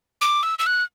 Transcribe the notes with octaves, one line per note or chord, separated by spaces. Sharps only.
D6
E6
E6
F#6